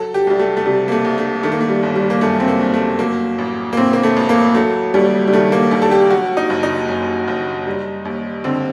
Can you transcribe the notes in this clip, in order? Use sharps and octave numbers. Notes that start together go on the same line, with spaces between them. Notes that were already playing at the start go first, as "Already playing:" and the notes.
Already playing: F#3 A4
G4
C2 G3
A3
A3
C3 G3
A#3
A3
C2
A3
D#3 A3
A#3
A3
G3
G1
G3
A#3
F#2 A3
C4
A#3
G1
A3
F#3 A#3
A1
A#3
A2 C4
A#3
A3
A1
A#3
F#3 A3
D#2 G3
G3
D#3 A3
A#3
D#2
A4
G4
F#3 F#4
D#4
F#1
D#4
F#2
F#1
G3
D#2
D3 C4